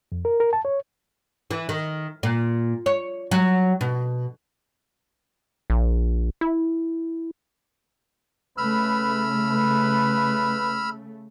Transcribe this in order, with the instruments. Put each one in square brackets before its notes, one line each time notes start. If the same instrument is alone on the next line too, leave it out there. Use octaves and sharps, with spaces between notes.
[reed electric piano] F2
A#4
A#4
A5
C#5
[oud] E3
D#3
A#2
C#5
F#3
B2
[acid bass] A#1
E4
[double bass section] C#3 A3 [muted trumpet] B4 [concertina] B5 E6 F6
[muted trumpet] B4